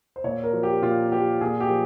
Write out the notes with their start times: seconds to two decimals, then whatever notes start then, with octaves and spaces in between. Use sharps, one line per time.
0.16 C5
0.24 A#2 C#5
0.44 A#4
0.53 F3
0.63 G4
0.82 A#2 F4
1.12 F3 G4
1.41 A#2 G#4
1.61 G4
1.70 F3